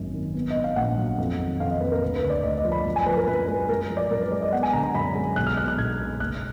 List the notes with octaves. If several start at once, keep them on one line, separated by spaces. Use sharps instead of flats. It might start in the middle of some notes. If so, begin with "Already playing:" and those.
Already playing: G#1 F#2 A#3
D#3
B3
D#5
G#2
F5
A#1 F#5
F#3
F2
D#3
F2 F5
D#5
A#3 B4
A#4
D2 B4
B4
D3
D5
D2 D#5
D#5
F3
B5
F#2
G#5
F3 B4
A#4
F#2 B4
G#3 B4
F#2 A#4
F3
D5
F#2 A#4
B4
G#3 D5
D#5
B3 F#5
G#5
D3 A#5
A#5
F#2 B5
G#3
B1 F#6
F6
B2 F#6
F#6
B1 G#6
G#3
F#1 F#6